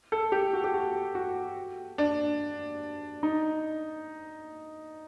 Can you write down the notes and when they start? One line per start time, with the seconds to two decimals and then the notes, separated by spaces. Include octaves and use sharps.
0.12 A4
0.32 G4
0.53 F#4
0.64 G4
0.74 F#4
1.15 F#4
1.98 D4
3.23 D#4